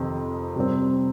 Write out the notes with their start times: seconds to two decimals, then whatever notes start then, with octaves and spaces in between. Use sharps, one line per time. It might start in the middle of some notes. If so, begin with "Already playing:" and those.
Already playing: F2 C3 D#3 C4
0.56 C3 G3 C4